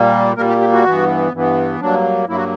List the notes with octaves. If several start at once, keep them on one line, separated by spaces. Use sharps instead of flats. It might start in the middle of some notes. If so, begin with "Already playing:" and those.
Already playing: A#2 G3 A#3
A#2 G3 A#3 A#4
G4
G4
F#4
G2 E3 B3
G2 E3 B3
G2 F#3 A#3 D4
G2 F#3 A#3 E4
F#4